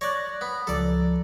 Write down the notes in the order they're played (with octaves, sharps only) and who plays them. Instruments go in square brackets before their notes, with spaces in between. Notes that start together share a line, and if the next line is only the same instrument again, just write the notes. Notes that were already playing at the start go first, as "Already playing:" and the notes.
[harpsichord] C#5 D5 [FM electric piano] F#6 A#6
[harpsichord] B3
[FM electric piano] C#2 F3 A#5 [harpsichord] A4 D5